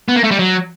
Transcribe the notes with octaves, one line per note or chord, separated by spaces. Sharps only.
B3
A#3
A3
G3
F#3